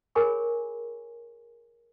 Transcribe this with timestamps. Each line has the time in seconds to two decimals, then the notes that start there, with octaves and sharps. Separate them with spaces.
0.15 G#4 A#4 C#5 G#5 B5 C#6